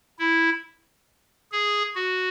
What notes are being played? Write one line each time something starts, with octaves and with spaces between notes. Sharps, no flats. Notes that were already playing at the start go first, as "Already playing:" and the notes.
E4
G#4
F#4